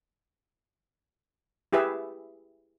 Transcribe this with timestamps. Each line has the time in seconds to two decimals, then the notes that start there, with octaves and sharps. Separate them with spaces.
1.73 E4 G4 G#4 B4 E5